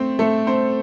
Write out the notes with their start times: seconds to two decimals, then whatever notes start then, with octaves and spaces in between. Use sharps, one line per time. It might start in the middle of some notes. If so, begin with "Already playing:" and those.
Already playing: A3 C4 C5
0.19 A3 A4
0.47 C4 C5